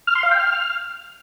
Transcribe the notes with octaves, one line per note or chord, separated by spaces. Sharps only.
F6
C6
F5
G5
F6